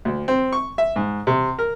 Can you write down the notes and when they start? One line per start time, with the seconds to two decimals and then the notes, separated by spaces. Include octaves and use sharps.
0.05 D2
0.28 C4
0.53 C#6
0.78 E5
0.96 G#2
1.27 C3
1.59 A#4